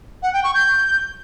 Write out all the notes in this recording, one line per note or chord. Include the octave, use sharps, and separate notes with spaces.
F#5
G5
C#6
G6